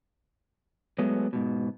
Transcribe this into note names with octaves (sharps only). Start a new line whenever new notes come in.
F#3 G#3 A3 B3
G#2 B2